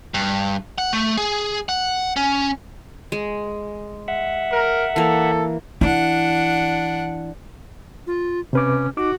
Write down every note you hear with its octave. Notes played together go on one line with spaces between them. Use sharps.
G2
F#5
A3
G#4
F#5
C#4
G#3
E5 F#5
A#4
E3 A#3 A4
E3 D4 E4 F#5
F4
C3 C#4 B4 D6
D#4 F#4 D6